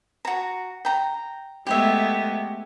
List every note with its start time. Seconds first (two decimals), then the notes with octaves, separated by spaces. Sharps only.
0.25 F#4 A#5
0.85 G5 A#5
1.67 G#3 A3 B3 G4 C#5 E5